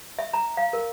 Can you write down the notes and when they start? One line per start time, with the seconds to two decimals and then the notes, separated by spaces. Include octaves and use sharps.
0.19 E5
0.33 A#5
0.57 F5
0.73 A#4